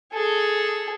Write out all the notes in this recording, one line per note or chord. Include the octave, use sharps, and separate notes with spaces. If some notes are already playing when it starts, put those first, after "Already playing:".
G#4 A4